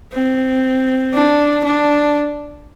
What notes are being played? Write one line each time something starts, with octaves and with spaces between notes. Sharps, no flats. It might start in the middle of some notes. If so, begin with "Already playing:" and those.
C4
D4
D4